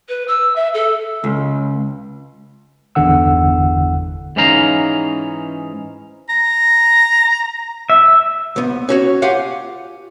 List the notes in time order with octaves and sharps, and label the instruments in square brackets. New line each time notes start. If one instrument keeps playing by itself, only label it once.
[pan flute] B4
E6
E5
A4
[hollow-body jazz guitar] C#2
[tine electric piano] G1 E2 G2 D3 F#5 E6
[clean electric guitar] G#2 E3 C#4 D#4 F5 A#5
[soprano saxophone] A#5
[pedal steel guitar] E5
[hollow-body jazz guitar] C2 B3
C#4 F#4 C#5
F4 G4 F5 F#5 G#5